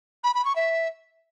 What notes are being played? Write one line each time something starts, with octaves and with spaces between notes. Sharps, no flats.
B5
B5
C#6
E5